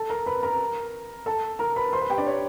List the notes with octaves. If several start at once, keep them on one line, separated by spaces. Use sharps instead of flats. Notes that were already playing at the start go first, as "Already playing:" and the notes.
Already playing: A4 A5
A#4 A#5
B4 B5
A#4 A#5
A4 A5
A#4 A#5
B4 B5
C5 C6
B4 B5
G4 G5
D4 D5
C#5